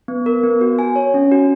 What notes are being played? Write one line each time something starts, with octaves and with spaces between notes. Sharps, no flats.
B3
A#4
B3
F#4
G#5
C#5
C#4
F#4